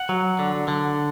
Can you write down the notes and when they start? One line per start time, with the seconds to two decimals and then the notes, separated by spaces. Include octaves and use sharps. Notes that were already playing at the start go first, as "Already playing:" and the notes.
Already playing: F#5
0.09 F#3
0.39 D3
0.68 D3